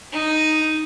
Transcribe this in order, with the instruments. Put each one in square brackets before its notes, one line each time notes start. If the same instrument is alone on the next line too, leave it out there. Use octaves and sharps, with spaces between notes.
[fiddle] D#4